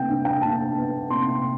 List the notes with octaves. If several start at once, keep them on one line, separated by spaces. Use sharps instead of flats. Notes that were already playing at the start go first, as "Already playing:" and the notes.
Already playing: C3 G5
D4
G5
D4 A5
B3
C3 C6